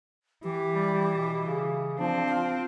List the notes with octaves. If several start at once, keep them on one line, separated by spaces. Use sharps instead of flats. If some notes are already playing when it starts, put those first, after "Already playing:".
E3 G4
G3
B2
C#3
F3 C4 D4
F4